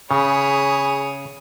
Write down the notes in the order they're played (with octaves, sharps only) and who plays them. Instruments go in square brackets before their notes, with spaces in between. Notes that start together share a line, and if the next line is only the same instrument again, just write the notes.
[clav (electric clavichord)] C#3 [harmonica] G#4 B5 [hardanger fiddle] C#5 D#6